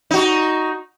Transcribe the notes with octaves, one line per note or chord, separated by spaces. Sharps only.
D#4 F#4